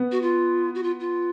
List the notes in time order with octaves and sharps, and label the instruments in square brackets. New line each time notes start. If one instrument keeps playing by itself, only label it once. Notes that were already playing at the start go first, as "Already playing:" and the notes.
Already playing: [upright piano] B3
[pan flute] F#4
F4
F#4
F4
F4